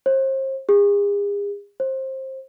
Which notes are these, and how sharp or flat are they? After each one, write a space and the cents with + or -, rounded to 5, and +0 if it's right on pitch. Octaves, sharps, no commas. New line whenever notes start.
C5 +35
G#4 -40
C5 +20